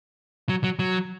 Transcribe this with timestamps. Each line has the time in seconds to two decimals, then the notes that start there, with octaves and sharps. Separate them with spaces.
0.49 F#3
0.64 F#3
0.79 F#3